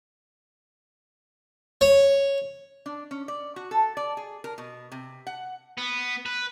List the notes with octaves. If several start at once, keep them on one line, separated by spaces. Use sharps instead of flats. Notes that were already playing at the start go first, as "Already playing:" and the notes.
C#5
D4
C#4
D5
F#4
A4
D5
G#4
A#4
B2
C3
F#5
B3
B4